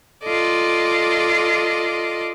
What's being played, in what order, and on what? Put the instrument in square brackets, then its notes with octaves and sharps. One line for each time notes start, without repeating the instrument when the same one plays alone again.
[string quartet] F4 A4 D5 D#5